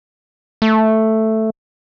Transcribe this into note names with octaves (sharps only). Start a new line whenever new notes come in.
A3